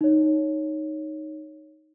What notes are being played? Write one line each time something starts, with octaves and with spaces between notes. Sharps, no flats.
D#4 C#5